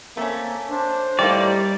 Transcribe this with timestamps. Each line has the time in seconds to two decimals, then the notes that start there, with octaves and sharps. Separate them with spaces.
0.17 A3 A#3 C4 C#4
0.70 D4 C5
1.19 A2 G3 A#3 D#4 G4 D5